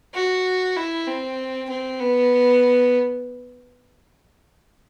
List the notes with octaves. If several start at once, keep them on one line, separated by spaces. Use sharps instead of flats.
F#4
E4
C4
C4
B3